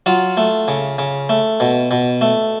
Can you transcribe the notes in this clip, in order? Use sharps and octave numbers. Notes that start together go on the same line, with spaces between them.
F#3 F4
A3
C#3
C#3
A3
B2
B2
A3